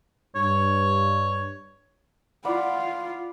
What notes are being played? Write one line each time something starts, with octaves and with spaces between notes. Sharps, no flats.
G2 C#5
F4 D5 F#5 B5